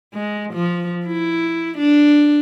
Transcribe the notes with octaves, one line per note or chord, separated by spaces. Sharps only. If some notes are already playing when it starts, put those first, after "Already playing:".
G#3
F3
E4
D4